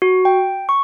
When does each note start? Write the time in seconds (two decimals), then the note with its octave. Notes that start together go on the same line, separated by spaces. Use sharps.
0.02 F#4
0.25 G5
0.69 C#6